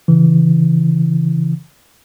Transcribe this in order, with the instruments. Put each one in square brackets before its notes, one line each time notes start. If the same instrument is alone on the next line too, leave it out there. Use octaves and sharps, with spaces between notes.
[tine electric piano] C#3 E3